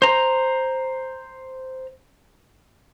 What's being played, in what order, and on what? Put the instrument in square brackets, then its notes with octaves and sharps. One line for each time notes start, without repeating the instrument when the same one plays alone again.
[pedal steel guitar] C5 A#5